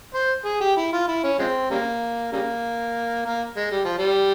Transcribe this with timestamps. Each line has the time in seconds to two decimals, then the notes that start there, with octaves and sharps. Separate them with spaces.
0.14 C5
0.45 G#4
0.61 G4
0.77 E4
0.93 F4
1.08 E4
1.23 C#4
1.39 F3 G#3 C4
1.70 C#3 G3 A#3
2.32 C#3 G3 A#3
3.25 A#3
3.56 G#3
3.71 G3
3.85 F3
3.98 G3